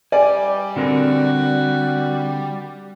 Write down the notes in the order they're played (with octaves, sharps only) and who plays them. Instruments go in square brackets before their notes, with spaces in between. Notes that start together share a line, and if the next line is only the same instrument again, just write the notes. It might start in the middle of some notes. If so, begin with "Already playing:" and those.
[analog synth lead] G3 [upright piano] D5 [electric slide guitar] G#5
[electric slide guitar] D3 C4 A#4 [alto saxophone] F#4